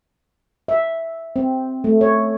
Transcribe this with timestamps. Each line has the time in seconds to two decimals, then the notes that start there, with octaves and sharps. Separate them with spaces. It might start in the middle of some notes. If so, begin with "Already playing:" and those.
0.68 E5
1.36 C4
1.84 A3
2.01 C#5